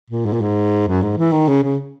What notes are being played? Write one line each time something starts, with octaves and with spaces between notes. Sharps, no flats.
A#2
G#2
A#2
G#2
F#2
G#2
E3
D#3
C#3
C#3